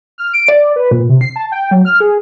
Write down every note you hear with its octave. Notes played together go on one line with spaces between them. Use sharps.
F6
D7
D5
B4
A#2
C3
C7
A5
G5
F#3
F6
G#4